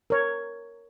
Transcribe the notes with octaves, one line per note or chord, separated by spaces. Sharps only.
A#4 C#5